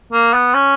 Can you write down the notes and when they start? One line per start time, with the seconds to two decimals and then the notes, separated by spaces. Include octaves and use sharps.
0.12 A#3
0.34 B3
0.54 C#4